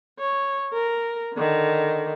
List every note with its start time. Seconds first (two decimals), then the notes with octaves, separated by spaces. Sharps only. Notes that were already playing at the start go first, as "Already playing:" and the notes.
0.19 C#5
0.73 A#4
1.33 D3 D#3